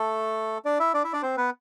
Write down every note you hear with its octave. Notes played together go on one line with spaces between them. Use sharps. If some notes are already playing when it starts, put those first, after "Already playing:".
Already playing: A3 A4
D4 D5
E4 E5
D4 D5
E4 E5
D4 D5
C4 C5
B3 B4